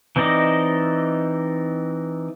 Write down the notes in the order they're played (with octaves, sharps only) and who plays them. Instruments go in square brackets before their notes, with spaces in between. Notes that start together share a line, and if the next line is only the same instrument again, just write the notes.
[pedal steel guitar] E3 C4 D#4 D5 D#5